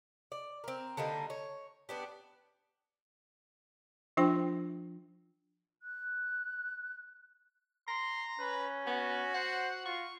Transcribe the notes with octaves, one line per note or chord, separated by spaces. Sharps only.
D5
C4 A#4
D3 G3 A#3 D#4
C#5
B3 D4 G4
F3 D4 F4 C5 G5 C6
F#6
A#5 C6
C#4 B4
B3 F#4
C5 F#5
F4 C#6